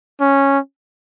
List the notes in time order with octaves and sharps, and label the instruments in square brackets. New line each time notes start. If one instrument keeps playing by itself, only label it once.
[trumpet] C#4